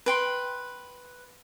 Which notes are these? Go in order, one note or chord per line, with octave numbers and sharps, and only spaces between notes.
B4 G5 C6